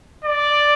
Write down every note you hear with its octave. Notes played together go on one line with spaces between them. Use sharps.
D5